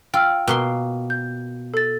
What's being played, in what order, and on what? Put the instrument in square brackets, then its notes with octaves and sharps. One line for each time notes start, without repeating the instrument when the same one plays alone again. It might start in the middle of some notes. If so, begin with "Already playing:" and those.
[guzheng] F4 [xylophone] G5 E6 F6
[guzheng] B2 A#3 C6
[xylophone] G6
A4 A6